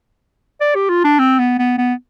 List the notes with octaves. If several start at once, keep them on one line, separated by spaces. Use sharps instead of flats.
D5
G4
F4
D4
C4
B3
B3
B3